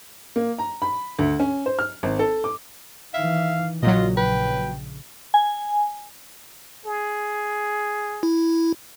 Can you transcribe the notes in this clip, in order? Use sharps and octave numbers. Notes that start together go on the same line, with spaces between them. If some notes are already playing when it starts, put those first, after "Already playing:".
A#3
A#5
B5
D2
C#4
C5
F6
G#1
A4
D6
D#3 E3 E5 F5
A#1 A#2 C#3 F#3 F4 D#5
B4 G5
G#5
G#4
E4